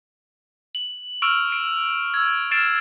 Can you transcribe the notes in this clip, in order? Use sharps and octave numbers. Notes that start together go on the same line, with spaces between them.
F#7
C#6 E6 F6 D7 F7
D7
E6 G#6
F6 A6 C7 D7 E7